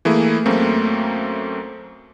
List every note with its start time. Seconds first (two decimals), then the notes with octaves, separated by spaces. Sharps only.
0.05 E3 A3 A#3 E4 G#4
0.46 F#2 A3 A#3 C4